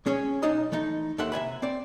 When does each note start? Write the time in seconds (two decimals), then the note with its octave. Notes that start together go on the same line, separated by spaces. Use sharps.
0.06 G#3 C#4 G#4 C#5
0.42 B1 D4 D#4 D#5 A#5
0.72 E3 A3 D#4
1.18 D#2 D#3 A4 E5 F#5 C6
1.32 C3 E5 G#5 B5
1.62 C4 D5